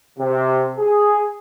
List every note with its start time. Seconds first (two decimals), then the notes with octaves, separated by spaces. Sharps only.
0.18 C3
0.78 G#4